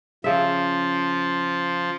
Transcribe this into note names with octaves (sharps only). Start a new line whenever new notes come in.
C#3 F3 E5